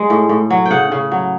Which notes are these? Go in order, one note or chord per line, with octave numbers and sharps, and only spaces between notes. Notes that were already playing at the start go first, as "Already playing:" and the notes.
Already playing: G#3 F#5
A2
A2
F#3
G5
C#3 F#5
C#3
F#3